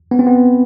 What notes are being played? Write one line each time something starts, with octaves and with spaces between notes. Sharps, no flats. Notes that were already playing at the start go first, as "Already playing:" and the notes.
B3
C4
B3